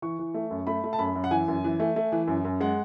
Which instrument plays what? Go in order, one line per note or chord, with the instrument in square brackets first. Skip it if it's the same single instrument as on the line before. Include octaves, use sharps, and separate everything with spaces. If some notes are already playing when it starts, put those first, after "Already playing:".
[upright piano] E3 C#6
E3
A3
F#2
A3 B5
A3
A5
F#2 B5
F#2
F#5
E3 G#5
F#2
E3
A3
A3
E3
F#2
F#2
G#3 F#5